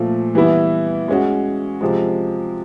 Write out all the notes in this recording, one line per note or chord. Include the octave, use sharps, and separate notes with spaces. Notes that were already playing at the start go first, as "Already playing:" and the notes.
Already playing: A#2 F3 A3
E3 G3 B3 E4
G#3 C#4 F#4
C3 F3 G#3